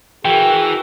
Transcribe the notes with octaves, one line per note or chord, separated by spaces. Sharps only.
E3 F#4 G#4 A#4 G5